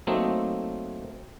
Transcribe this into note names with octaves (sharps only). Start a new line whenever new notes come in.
F#3 A3 A#3 C4 D#4